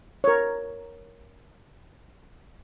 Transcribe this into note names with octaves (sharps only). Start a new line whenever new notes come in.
A#4 C#5